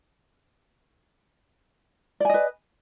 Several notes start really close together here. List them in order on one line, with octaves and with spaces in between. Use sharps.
D5 G#5 D#5 B4